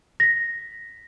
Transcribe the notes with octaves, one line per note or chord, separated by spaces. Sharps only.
A#6 B6